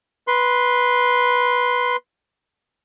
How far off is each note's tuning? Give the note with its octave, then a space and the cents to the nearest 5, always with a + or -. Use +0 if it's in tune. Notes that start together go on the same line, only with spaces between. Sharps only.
B4 -10 C6 -5